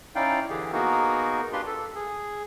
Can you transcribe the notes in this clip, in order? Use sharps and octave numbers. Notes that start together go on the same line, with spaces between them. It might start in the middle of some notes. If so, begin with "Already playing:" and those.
C#4 D#4 E4 D5 F5 G5
D3 E3 G4 G#4
A#3 B3 D#4 F#4 G#4 A#4
D4 F4 G4 B4 C6
A4
G#4